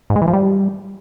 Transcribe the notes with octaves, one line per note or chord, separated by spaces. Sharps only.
G#2
G#3
E3
F3
G3